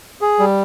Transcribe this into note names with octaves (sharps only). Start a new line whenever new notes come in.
G#4
G3